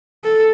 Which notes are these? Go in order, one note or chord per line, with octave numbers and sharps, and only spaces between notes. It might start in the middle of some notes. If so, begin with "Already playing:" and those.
A4